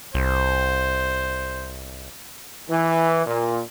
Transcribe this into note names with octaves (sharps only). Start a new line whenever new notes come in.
C2 C5
E3
A#2